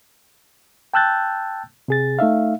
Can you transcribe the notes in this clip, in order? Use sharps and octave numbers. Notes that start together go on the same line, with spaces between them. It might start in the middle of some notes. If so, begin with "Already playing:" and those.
G5 A5 E6 F#6 G6 A6
C3 G#4 A6
A3 D#4 E5 F5